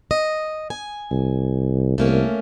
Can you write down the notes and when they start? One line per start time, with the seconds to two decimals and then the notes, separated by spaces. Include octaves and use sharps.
0.11 D#5
0.70 G#5
1.11 C2
1.98 C2 A3 A#3 C#4